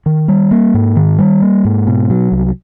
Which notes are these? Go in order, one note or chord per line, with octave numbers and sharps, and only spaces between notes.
D#3
G3
A#3
G#2
D#3
G3
A#3
G#2
B2
F#3
C2